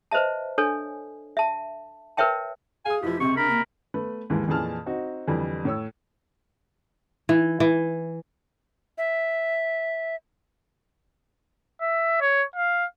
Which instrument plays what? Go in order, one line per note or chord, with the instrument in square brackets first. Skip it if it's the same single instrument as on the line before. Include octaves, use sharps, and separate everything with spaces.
[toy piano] B4 C5 D#5 E5 A5
D4 A4 C#5 G#5
E5 A5
A#4 B4 C#5 E5 G5 A5
[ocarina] G#4 [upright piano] F5 D#6 [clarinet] G#5
[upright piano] F1 F3 [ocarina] E4 [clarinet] G4
[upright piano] C#2 C3 [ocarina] C4 [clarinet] C#6
[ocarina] D4 [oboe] A#4 [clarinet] B5
[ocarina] A#3
[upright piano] A3 B3 B4
D#2 G#2 E3
F2 A#2 E3 G#4 A5 F6
C4 D#4 F#4
F2 D3 E3 G3
A2 C#5 E6
[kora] E3
E3
[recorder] E5
[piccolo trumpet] E5
C#5
F5